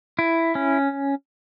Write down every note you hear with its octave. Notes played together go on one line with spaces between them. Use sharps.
E4
C#4